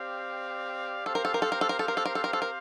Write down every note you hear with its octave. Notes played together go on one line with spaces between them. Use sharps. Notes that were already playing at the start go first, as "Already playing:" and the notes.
Already playing: C4 G4 D5 F5
C4 G4 A4 C5 F5
A#4
A4
A#4
A4
A#4
A4
A#4
A4
A#4
A4
A#4
A4
A#4
A4
A#4